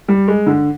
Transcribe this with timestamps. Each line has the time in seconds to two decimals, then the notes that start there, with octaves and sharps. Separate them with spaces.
0.08 G3
0.28 G#3
0.46 D3